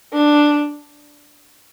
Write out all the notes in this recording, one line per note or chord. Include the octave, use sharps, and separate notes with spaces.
D4